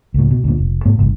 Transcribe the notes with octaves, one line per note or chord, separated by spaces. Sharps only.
C#2 A2
B2
D2 A#2
F1
G#2 A3 B3
G1 C2